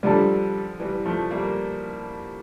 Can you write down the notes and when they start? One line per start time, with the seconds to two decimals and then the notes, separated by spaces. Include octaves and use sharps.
0.03 D3 F3 G3 D4 A4
0.80 E3 G3
1.06 F3 A3
1.31 G3 A#3